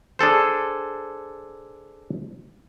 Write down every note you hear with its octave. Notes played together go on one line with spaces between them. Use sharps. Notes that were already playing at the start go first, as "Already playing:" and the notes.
D4 G#4 A4 C5